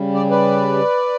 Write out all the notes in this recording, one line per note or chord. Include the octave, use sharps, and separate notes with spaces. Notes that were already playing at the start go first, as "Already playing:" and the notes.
Already playing: C#3 G3
D5
B4 D5